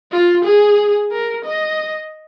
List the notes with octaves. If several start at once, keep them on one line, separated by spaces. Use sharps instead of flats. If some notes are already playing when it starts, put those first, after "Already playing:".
F4
G#4
A#4
D#5